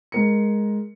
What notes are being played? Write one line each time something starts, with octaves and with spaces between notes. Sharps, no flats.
G#3 A#4 C#7